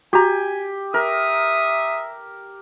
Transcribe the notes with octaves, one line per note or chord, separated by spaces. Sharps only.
F#4 G4 G#5 A#5
A#4 E5 D#6